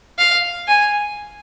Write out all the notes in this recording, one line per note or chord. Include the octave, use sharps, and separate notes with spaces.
F5
G#5